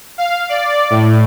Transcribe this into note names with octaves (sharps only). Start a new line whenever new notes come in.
F5
D5
A2